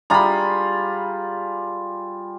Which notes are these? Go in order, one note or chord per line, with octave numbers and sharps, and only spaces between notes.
G3 F4 G#4 A#5 B5